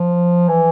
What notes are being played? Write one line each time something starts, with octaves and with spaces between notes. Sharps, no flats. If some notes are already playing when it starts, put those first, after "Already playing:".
Already playing: F3
E3